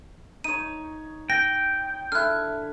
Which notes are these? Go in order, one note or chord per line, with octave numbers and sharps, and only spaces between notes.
D#4 C#5 D#7
G5 A#6
D3 E4 F6 F#6